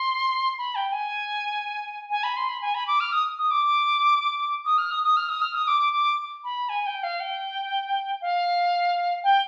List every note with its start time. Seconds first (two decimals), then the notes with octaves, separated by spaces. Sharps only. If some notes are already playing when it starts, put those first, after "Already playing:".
Already playing: C6
0.58 B5
0.75 G5
0.92 G#5
2.10 G#5
2.23 B5
2.37 C6
2.49 B5
2.62 G#5
2.75 B5
2.87 D6
3.00 F6
3.12 D#6
3.38 D#6
3.51 D6
4.65 D#6
4.78 F6
4.91 D#6
5.04 D#6
5.17 F6
5.29 D#6
5.42 F6
5.55 D#6
5.67 D6
5.93 D6
6.44 B5
6.69 G#5
6.86 G5
7.03 F5
7.20 G5
8.21 F5
9.24 G5